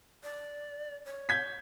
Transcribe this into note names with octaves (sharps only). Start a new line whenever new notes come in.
D5
C#5
G6 G#6 B6